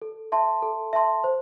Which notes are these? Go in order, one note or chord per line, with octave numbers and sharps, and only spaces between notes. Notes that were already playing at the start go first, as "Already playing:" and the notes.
A4
E5 A5 C6
A4
E5 A5 C6
C5